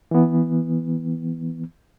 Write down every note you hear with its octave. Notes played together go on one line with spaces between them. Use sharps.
E3 B3